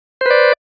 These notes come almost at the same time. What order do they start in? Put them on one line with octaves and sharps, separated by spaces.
C5 B4 D5